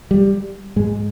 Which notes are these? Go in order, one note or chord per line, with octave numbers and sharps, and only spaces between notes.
G3
G#2 G#3